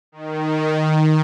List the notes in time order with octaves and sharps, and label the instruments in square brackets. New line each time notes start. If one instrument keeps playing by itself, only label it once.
[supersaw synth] D#3